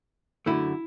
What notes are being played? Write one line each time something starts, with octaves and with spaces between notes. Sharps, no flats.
F#2 D3 A3 E4